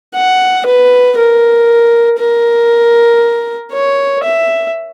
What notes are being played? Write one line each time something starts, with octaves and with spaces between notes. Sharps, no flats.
F#5
B4
A#4
A#4
C#5
E5